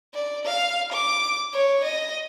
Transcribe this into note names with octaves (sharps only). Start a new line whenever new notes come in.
D5
F5
D6
C#5
D#5